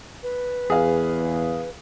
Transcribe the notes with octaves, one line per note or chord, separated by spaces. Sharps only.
B4
E2 G#4 F5